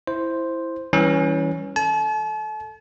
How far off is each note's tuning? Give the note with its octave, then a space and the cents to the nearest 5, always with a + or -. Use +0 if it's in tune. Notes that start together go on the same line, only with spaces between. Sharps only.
E4 +0 C5 +0
E3 -20 G3 +0 C#4 +0
A4 +0 A5 -40